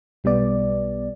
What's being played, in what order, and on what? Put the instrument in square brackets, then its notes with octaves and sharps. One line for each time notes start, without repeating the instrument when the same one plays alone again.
[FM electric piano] B1 G3 B3 D5